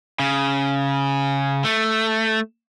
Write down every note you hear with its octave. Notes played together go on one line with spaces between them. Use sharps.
C#3
A3